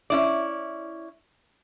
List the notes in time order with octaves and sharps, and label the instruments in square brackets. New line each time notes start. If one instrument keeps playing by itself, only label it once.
[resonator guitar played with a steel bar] C#4 E4 D5